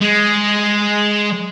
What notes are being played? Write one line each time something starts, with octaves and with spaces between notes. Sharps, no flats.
G#3